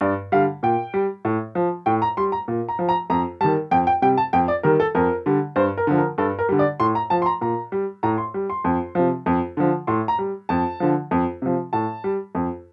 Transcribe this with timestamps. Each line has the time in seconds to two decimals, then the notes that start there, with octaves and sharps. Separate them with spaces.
0.01 G2 D5
0.32 D3 G3 F5
0.63 A#2 G5
0.94 G3
1.25 A2
1.55 F3
1.86 A2 G5
2.02 A#5
2.17 G3 C6
2.32 A#5
2.48 A#2
2.69 A#5
2.79 F3
2.89 A#5
3.10 F2 A#5
3.41 D#3 G3 A5
3.71 F2 G5
3.87 G5
4.02 C3 G3 G5
4.18 A5
4.33 F2 G5
4.48 D5
4.63 D#3 G3 A#4
4.80 A4
4.95 F2 A#4
5.26 D3 G3
5.56 G2 C5
5.77 A#4
5.87 D3 F3
5.98 A#4
6.18 G2 A4
6.39 A#4
6.49 D3 G3
6.59 D5
6.80 A2 C6
6.95 A#5
7.10 F3 A5
7.22 C6
7.26 A#5
7.41 A#2 A#5
7.72 G3
8.03 A2 A#5
8.18 C6
8.34 G3
8.50 C6
8.64 F2
8.95 C3 F3
9.26 F2
9.57 D3 F3
9.87 A2 C6
10.08 A#5
10.19 G3
10.49 F2 A5
10.80 D3 F3
11.11 F2
11.42 C3 F3
11.73 A2 A5
12.04 G3
12.35 F2